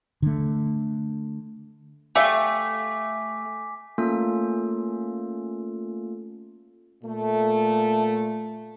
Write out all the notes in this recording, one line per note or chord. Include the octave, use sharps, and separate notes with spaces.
D3 A3
A3 G4 E5 F5 G#5 D6 B6
A3 A#3 C#4 F4 A4
A#2 A3